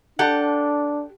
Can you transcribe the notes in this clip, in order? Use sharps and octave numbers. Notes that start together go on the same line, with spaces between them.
D4 G4 A4 F#5